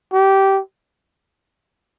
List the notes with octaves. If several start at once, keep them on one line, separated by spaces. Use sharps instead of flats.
G4